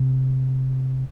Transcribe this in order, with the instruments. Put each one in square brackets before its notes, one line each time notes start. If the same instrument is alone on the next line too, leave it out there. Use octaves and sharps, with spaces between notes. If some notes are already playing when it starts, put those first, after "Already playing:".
Already playing: [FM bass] C3